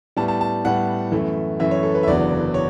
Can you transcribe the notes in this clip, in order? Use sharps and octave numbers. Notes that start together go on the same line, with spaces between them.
A2 G3 B3 A5
A5
A5
A2 G3 B3 F#5
F#2 E3 A3
F#2 E3 A3 E5
C#5
A4
B4
E5
F#1 E2 D3 F#3 B3 D5
C#5